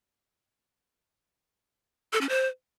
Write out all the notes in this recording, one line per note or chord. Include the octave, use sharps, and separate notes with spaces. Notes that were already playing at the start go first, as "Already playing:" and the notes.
A4
C#4
C5